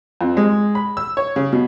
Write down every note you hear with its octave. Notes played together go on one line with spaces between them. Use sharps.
F2
G#3
B5
E6
C#5
C#3
B2